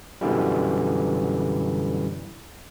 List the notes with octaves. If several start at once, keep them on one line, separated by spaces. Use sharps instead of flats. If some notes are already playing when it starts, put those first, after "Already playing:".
F#2 B2 D3 E3 G3